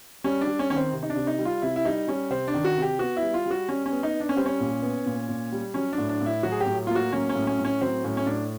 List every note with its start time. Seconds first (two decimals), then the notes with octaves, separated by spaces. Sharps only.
0.24 G3 C#4
0.41 D4
0.47 G3
0.59 C#4
0.70 D#3 C#4
0.77 C4
0.93 C3
1.03 D#4
1.10 D4
1.16 C3
1.27 D#4
1.39 G3
1.45 F4
1.62 C3 E4
1.76 E4
1.85 G3 D#4
2.08 G3 C#4
2.30 C3 C4
2.48 D4
2.54 D#3
2.65 F#4
2.77 C3
2.82 G4
2.99 B3 F#4
3.17 E4
3.22 G3
3.34 F4
3.46 G3
3.51 F#4
3.69 G3 C#4
3.86 C#4
3.92 B3
4.03 D#4
4.14 B3
4.20 D4
4.29 C#4
4.37 G3 C4
4.46 C#4
4.60 A#2
4.82 B3
5.06 A#2
5.29 A#2
5.52 G3
5.74 F#3 C#4
5.93 D4
5.98 A2
6.09 D4
6.21 A2
6.26 E4
6.43 F#3 F#4
6.52 G#4
6.61 G4
6.66 A2
6.87 A#3 F4
6.95 F#4
7.12 F#3 C#4
7.29 C#4
7.35 A2
7.47 C#4
7.59 A2
7.65 C#4
7.81 F#3 C4
8.04 A2 C#4
8.17 C#4
8.27 A2 D4